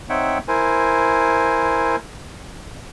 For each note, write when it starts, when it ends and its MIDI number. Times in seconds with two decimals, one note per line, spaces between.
0.09 0.38 60
0.09 0.38 63
0.09 0.38 73
0.09 0.38 76
0.09 0.38 78
0.09 0.38 79
0.48 1.96 64
0.48 1.96 70
0.48 1.96 72
0.48 1.96 80